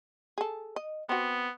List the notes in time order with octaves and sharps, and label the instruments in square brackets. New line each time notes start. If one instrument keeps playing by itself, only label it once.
[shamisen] G#4 A4
D#5
[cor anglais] B3 [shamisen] C4 F#4